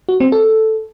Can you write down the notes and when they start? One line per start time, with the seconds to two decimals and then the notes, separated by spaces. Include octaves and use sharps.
0.09 F#4
0.20 C4
0.32 A4